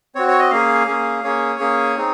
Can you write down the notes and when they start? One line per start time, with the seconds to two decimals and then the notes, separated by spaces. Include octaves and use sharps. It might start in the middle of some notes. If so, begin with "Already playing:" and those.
0.15 C4 F#4 C#5
0.28 C#5
0.39 D#5
0.51 A#3 C#4 G#4 F5
0.87 A#3 C#4 G#4
1.24 A#3 C#4 G#4 C#5
1.59 A#3 C#4 G#4
1.97 C4 D#4 G#4